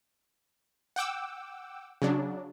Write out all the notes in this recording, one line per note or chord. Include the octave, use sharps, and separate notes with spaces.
F#5 G5 D6 E6
C#3 F#3 D4